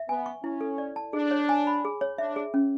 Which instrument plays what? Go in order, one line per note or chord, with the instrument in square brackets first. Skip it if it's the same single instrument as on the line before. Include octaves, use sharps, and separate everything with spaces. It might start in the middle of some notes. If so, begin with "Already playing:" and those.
Already playing: [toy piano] E5
[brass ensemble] B3 [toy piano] G#5
[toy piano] C#6
[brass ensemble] C#4 [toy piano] E4
[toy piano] A4
D5
A5
[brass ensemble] D4 [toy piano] G#4
[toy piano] C#5
G#5
B5
G#4
C#5
[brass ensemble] D4 [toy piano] E5
[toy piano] G#4
C#4